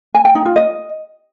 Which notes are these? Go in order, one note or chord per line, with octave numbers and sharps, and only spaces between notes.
G#5
G5
D#4
F4
D#5